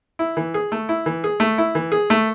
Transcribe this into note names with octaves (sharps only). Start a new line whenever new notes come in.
E4
E3
G#4
A3
E4
E3
G#4
A3
E4
E3
G#4
A3